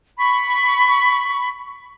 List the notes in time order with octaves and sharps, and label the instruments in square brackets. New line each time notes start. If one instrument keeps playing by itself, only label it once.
[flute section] B5 C#6